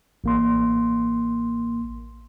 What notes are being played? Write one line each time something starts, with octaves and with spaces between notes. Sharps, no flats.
A1 A#3 C6